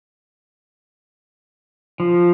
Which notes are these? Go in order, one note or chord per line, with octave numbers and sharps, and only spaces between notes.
F3